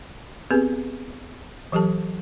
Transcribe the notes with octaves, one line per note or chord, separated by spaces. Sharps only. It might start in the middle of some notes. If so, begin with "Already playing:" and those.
B3 C4 G4 G#4 B4
E3 F#3 G4 A4 A5